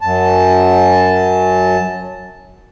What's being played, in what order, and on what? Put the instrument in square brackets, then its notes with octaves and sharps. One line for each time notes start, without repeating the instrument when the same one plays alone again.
[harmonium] F#2 A5